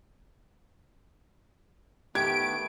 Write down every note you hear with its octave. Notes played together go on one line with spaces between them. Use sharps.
D#3 A3 B3 G4 G#6 D7